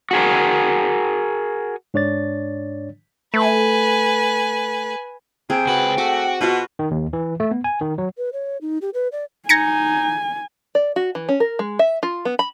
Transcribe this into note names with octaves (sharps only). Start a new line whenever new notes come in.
F#4 G#4 A#4
G#2 D4 C#5 D5 A6
A3 B4 G#5
C3 C4 G#4 G5
C#2 F#4 B4
A3 F#4 D6
B2 F4 F#4 B4
D#3
D#2
E3
A3
B3
G#5
D#3
F#3
B4
C#5
D#4
G4
B4
D5
D#4 G#5 G#6 A#6 C#7
D5
F#4
E3
C#4
A#4
G#3
E5
F4
B3
B5